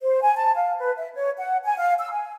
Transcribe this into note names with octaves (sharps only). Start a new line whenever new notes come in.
C5
G#5
A5
F5
B4
E5
C#5
F#5
G#5
F5
E6
G#5